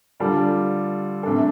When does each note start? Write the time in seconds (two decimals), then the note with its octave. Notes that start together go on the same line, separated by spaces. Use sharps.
0.20 D3 G3 F4 A4 D5
1.23 C3 A3 D4 A4